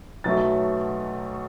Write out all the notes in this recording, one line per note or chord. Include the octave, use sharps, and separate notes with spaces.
B1 B2 F#3 A3 A6